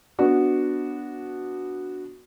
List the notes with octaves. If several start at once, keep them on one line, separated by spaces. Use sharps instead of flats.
B3 D4 F#4 D5